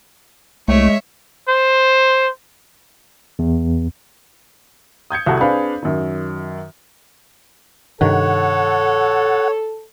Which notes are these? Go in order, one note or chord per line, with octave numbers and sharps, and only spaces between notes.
C2 G#3 A3 C#5 E5
C5
E2
D#6 G6 G#6 C#7
C2 F#4 A4
C4 D4 G#4 B4 F5 B5
F#2 D#3
G2 C3 D#3 A4 C#5 F#5